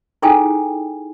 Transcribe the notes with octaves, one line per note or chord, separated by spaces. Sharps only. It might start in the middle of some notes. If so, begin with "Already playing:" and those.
D#4 E4 G#4 A4 G5 G#5